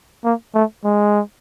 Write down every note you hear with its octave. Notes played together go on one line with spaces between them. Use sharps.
A#3
A3
G#3